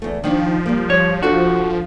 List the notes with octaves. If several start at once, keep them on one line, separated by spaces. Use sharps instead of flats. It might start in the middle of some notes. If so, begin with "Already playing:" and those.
E2 A3
D#3 F3 D4 D#4
G3 A#3
G3 C#5
D4 F4 F#4 A4